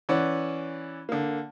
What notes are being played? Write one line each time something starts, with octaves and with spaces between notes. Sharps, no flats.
E3 C#4 D5 F#5
D3 A#3